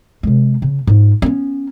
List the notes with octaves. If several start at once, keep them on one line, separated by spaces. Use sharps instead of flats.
C3 G#3
C#3
G#2 F4
B3 C#4